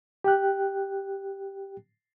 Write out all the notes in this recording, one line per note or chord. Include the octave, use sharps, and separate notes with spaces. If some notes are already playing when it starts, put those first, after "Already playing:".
G4 G5 F#6